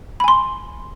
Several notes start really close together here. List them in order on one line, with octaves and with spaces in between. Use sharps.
B5 G#5 C6